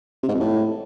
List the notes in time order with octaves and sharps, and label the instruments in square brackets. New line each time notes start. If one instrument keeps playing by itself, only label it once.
[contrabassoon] C3
G#2
F2
A2